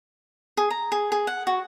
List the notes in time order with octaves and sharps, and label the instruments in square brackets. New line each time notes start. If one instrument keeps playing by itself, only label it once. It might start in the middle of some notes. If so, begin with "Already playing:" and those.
[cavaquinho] G#4
A#5
G#4
G#4
F#5
F#4